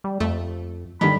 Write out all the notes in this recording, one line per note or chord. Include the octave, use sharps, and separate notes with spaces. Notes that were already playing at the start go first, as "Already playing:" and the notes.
G3
F2 A3
G2 D3 D#3 G3 B5